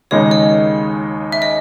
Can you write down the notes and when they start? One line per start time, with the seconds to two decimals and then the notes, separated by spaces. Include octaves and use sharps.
0.11 D#2 C#3 G#3 D#4 C#5
0.31 D#5
1.32 E5
1.42 D#5